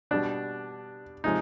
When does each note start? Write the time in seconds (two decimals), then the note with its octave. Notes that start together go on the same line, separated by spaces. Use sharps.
0.11 B2 G3 D4
1.24 C3 F3 G#3 D#4